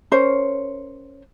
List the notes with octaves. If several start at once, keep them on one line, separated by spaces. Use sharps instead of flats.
C#4 A#4 C5 C#5